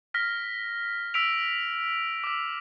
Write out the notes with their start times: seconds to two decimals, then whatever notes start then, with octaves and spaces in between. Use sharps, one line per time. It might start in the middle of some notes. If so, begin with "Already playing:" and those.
0.14 F6 A#6 B6
1.14 E6 B6 D7 F7
2.24 D6 E6